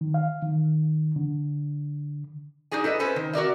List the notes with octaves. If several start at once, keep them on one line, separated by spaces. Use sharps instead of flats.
D#3
F5
D#3
D3
D4 D#4 F#4 G#4 G#5
E4 A4 B4 D#5
C#4 A4 B4 C5 G#5
D#3
F#4 A#4 D5 E5